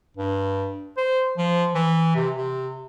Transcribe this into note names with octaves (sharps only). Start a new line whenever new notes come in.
G2
C5
F3
E3
C3
C3